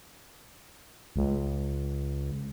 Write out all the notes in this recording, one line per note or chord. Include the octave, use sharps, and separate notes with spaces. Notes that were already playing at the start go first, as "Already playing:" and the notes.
C#2